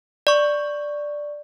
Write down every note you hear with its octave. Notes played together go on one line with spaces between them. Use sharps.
D5 C#6